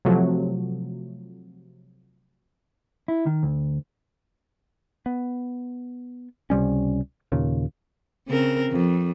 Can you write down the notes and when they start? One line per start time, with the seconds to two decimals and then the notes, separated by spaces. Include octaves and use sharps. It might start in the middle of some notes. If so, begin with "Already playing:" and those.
0.05 C3 F3 F#3 A3
3.08 E4
3.26 D#3
3.43 D2
5.06 B3
6.50 C#2 C3 G3 C#4
7.32 D#2 A#2 C#3
8.28 C#3 C4 A#4
8.71 F2